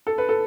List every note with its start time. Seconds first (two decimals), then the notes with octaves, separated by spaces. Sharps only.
0.07 A4
0.18 B4
0.29 A4